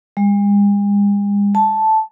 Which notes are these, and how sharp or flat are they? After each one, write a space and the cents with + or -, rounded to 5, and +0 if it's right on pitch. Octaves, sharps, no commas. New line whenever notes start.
G#3 -45
A5 -5